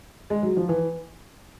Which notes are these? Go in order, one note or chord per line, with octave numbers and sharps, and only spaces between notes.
G#3
F#3
F3
E3